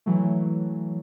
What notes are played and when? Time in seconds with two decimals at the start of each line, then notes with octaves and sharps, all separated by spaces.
0.06 E3 F#3 A3